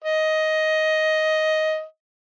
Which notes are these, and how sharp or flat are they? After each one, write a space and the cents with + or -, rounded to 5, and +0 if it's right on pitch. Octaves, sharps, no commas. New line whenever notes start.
D#5 +10